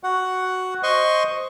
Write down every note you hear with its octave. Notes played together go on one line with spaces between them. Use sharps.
F#4 F#5
C5 D#5 C6 C#6